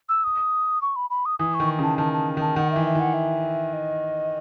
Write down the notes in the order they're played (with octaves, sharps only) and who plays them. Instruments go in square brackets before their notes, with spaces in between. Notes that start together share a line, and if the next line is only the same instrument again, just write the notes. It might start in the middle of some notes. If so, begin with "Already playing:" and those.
[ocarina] E6
D#6
C#6
B5
B5
D#6
[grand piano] E3 [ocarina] D#6
[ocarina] C#6
[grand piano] D#3
[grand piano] C#3 [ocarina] A5
[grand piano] D#3 [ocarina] A5
[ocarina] A5
[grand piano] D#3 [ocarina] A5
[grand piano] D#3 [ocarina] F#5
[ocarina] E5
[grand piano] E3
[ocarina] E5
[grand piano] E3 [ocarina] F#5
[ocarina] E5
D#5